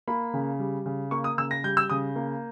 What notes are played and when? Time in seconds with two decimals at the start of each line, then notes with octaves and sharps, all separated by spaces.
0.08 A#3 B5
0.34 C#3
0.59 G3
0.86 C#3
1.11 A#3 C#6
1.24 D#6
1.38 C#3 E6
1.51 A#6
1.64 G3 G6
1.77 E6
1.90 C#3 D#6
2.16 A#3